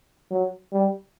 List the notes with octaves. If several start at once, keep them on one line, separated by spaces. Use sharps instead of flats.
F#3
G3